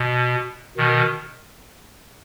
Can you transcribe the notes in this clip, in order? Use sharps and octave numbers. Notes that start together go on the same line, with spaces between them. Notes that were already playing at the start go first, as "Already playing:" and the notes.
Already playing: B2
B2 D#3